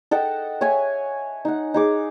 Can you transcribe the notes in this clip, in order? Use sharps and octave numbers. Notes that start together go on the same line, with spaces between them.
A4 D#5 F#5 G5
C#5 E5 G#5
D#4 F#5
D#4 G#4 D6